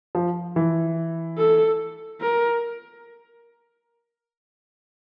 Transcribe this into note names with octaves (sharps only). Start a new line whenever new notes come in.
F3
E3
A4
A#4